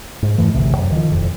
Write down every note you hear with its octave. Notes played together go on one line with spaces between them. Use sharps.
G#2
F2 G#2 E3 A3
A1 D2 C3
F#2
D#3 F3
E1 F2